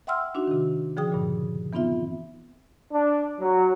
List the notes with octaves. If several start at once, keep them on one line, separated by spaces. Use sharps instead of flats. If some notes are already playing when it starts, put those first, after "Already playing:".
E5 F#5 G5 C6 E6 F6
D4 D#4 F#4
C3 D#3
D3 F3 G#4 G5 D#6
G2 A#2 C#3
E3 B3 C4 D#4 F4 E5
D4
F#3